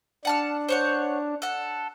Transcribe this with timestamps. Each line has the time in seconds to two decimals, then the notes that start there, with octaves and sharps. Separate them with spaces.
0.25 D4 F#5 A5 F6
0.69 C5 C#5 F#5
1.42 A4 F#5